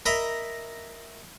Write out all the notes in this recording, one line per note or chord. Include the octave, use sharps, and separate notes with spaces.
A#4 D#5 E5 A#5 B5